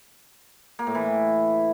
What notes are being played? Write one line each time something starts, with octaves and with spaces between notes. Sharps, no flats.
A#3
A2
E3